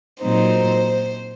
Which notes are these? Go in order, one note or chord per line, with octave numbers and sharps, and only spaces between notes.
A#2 F#3 C4 D#4 C5